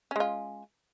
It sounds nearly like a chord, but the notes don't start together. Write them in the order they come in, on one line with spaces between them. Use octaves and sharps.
C#4 G#3 F4